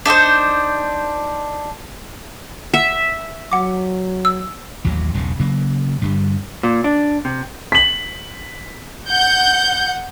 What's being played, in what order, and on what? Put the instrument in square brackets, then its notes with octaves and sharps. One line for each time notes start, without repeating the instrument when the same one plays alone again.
[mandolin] D4 D#4 A4 C5
[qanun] E5 [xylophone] F#5
[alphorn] F#3 [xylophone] F#5 D6
[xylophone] E6
[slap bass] A1 D#2 A2 F#3
E1 B1 C#3
C#3 F#3 A#3
G2 D3 G3
[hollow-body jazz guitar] A#2
D4
C3
[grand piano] B6 F#7
[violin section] F#5 G6